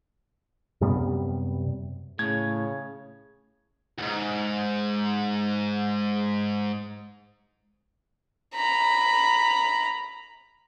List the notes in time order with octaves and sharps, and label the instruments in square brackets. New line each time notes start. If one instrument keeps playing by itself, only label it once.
[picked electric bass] F#2 C3 G3 B3
[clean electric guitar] A2 [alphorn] C#3 [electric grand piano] G#6
[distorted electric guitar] D2 G#2
[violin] A#5 B5